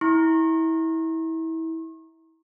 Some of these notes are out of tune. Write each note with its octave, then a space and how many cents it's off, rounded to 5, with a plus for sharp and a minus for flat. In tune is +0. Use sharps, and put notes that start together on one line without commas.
E4 -25 C#6 -45